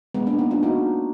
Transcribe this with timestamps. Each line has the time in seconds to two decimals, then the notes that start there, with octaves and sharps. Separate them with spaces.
0.14 G#3 B3
0.27 A#3 D4
0.38 B3 D#4
0.51 D4 F4
0.63 D#4 F#4